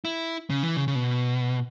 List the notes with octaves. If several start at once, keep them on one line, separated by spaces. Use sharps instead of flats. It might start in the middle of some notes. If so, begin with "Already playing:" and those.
E4
C#3
E3
C#3
C#3
B2